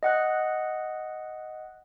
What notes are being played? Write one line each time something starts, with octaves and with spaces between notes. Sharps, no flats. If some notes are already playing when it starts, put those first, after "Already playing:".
D#5 F#5 F#6